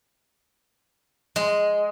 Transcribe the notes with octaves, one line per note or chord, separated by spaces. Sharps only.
G#3